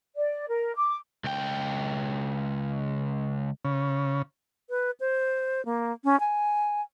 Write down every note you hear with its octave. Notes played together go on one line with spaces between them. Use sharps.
D5
A#4
D6
C#2 G5
C#3
B4
C5
A#3
C#4
G#5